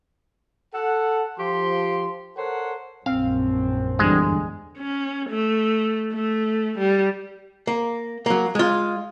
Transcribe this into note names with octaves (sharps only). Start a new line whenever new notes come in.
A4 F#5
F3 G4 C6
A4 A#4 C5 C#5 F#5
A#1 F#2 C4 F5
E2 G2 D3 G#3
C#4
A3
A3
G3
A#3
F#3 A#3
G#3 F4